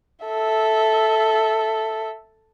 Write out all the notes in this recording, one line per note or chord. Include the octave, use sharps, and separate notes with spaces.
A4 E5